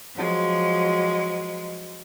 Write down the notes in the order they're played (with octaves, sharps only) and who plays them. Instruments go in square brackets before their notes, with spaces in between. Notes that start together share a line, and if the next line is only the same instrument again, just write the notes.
[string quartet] F3 F#3 G#3